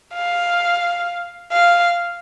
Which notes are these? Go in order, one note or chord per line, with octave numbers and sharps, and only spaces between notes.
F5
F5